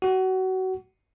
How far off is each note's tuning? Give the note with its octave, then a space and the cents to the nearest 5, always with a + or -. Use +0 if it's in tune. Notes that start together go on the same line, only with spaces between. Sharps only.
F#4 +25